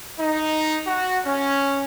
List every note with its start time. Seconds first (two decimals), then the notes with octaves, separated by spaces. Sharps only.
0.20 D#4
0.87 F#4
1.26 C#4